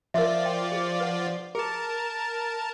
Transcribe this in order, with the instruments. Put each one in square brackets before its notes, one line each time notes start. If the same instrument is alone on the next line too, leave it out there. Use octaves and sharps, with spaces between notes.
[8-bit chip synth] F3 F4 D5 [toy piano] A#4 E5
[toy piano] G5
G#4
B4 F#5
[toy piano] G#4 [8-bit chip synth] A#4 A5